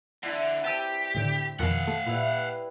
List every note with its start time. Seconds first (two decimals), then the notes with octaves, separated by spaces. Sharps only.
0.23 D3 D4 E4 F#5
0.64 C4 G4 A5 E6 D#7
1.15 A2 D3
1.59 F2 B2 D#3 F5 F#5
1.87 A3 C7
2.06 A#2 G3 E4 B4